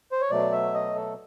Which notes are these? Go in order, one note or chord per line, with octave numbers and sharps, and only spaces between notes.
C5
C#5
B2 F#3 A3 D5
E5
D#5
A4